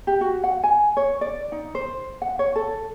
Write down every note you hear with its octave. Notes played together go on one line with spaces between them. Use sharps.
G4
F#4
F#5
G#5
C#5
D5
D#4
C5
F#5
C#5
A4